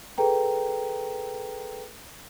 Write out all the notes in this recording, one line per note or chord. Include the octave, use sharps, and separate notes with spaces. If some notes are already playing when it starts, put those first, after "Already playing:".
G#4 A4 B4 G5 A#5